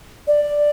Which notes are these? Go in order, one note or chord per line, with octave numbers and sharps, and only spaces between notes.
D5